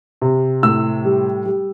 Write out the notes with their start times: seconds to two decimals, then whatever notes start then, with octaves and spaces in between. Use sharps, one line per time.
0.22 C3
0.63 A2 E6
1.05 G3
1.46 G3